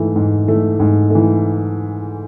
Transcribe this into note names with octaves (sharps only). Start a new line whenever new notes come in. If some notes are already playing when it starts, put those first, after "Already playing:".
Already playing: G#2 E3 A3
G#2
E3 A3
G#2
E3 A3